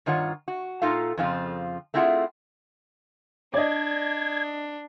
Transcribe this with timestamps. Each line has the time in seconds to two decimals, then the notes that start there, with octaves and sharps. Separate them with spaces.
0.06 G2 D#3 F4 C#5 F#5
0.48 F#4
0.82 A#2 D#4 F4 A4 F5
1.17 F2 C#3 F3 C4 F4
1.94 A3 C4 E4 F4 G#4 F#5
3.54 D4 D5 D#5 G#6